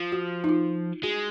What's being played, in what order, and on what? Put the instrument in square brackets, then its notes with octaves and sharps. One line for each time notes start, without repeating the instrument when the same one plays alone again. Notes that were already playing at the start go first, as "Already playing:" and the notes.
Already playing: [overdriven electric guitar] F3
[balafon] F#4
D#4
F4
[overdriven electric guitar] G#3 [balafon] F#4